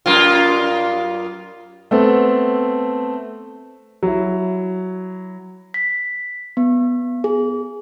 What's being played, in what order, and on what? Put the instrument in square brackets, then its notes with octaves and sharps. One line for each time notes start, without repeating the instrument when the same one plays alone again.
[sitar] F#2 A#3 F4
[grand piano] A3 B3 C4 A4
F#3 E4
[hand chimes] B6
B3
G#4